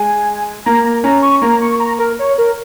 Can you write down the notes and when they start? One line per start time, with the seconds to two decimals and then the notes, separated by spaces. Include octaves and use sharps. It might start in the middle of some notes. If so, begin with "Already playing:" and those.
Already playing: G#3 G#5
0.66 A#3 A#5
0.85 A#5
1.04 C#4 A#5
1.22 C#6
1.42 A#3 A#5
1.61 C#6
1.80 A#5
1.99 A#4
2.19 C#5
2.38 A#4